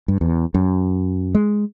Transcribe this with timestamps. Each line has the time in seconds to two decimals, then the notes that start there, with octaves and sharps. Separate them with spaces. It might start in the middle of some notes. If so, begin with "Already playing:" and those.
0.08 G2
0.21 E2
0.54 F#2
1.35 G#3